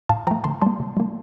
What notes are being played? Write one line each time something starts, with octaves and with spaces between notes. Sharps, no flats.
A2 F5 A5
F3 A3 G5 A#5
D3 A5 C6
G3 A#3 A5 C6
C3
G3 A#3